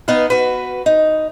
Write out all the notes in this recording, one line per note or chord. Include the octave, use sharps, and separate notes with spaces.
B3 D#4 B4 F5
F#4 B4
D#4